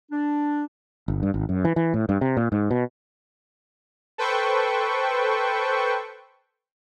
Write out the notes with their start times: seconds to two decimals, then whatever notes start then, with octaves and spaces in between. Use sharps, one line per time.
0.12 D4
1.08 G1
1.23 G2
1.34 G#1
1.49 F#2
1.65 E3
1.76 E3
1.94 A2
2.09 G2
2.21 C3
2.37 A#2
2.52 G#2
2.71 B2
4.18 A4 B4 C5 G5 C#6